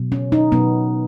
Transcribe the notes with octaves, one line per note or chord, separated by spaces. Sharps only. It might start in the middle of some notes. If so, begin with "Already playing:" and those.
Already playing: B2 F#3
C#4
D#4
B2 F#3 B3